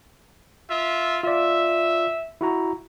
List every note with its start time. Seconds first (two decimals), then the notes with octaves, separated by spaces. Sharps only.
0.70 F4 E5
1.23 F4 D5 E5
2.41 E4 F#4 A#5